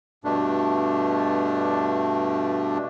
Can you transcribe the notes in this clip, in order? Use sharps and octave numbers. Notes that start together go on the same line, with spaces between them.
G2 B2 A3 D4